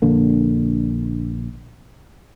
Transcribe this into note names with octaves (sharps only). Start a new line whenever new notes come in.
A#1 D3 A#3